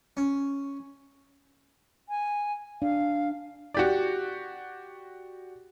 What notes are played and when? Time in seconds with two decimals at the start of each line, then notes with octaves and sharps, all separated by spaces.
0.17 C#4
2.09 G#5
2.82 D4 F5
3.74 F#4 G4 D5